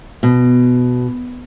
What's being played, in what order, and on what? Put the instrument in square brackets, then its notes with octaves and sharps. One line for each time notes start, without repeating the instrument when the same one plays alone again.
[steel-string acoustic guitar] B2